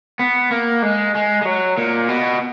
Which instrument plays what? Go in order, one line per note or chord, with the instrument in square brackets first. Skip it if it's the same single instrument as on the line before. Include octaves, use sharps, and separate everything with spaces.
[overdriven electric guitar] B3
A#3
G#3
G#3
G#3
F#3
A#2
B2